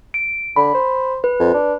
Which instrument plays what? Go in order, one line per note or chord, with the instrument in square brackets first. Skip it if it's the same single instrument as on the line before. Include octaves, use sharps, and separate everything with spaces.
[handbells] D7
[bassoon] D3 [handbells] B5
[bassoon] C5
[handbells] B4
[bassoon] F2
D4